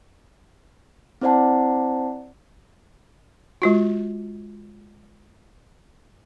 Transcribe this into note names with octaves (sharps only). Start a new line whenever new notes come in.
C4 E4 C5 D5 F#5 A5
G#3 F4 F#4